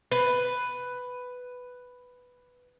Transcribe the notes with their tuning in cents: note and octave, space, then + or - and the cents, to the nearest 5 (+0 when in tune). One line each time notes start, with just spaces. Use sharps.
B4 +5